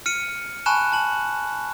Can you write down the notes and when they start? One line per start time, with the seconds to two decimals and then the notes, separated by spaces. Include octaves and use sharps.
0.06 F6 C#7 D#7
0.66 G#5 A5 B5 C#6 F#6 E7
0.93 A5 F#7